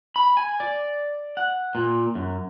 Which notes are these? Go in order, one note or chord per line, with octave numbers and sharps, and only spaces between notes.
B5
G#5
D5
F#5
A#2
F#2